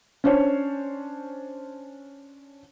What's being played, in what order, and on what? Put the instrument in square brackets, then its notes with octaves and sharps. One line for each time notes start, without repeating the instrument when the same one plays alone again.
[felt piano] C#4 D4 C5 C#5